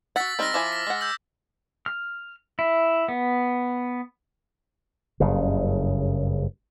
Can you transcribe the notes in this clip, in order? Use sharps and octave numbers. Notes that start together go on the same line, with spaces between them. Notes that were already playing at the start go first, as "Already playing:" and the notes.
F#4 F#5 E6 A6 B6
G3 C4 D#4 E6 F6 A#6
F3 E4 G#5 D6
B6
G#3 F#5
E6 G6
F6
E4
B3
F#1 G2 C#3